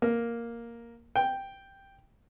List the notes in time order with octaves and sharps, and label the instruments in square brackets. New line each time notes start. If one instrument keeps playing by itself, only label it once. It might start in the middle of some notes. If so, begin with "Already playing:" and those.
[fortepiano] A#3
G5